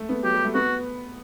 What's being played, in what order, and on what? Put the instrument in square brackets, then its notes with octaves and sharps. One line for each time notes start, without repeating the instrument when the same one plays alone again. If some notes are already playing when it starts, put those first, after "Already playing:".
Already playing: [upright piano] A3
B3
[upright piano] F#3 [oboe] G4
[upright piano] G3
A3
[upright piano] B3 [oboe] F#4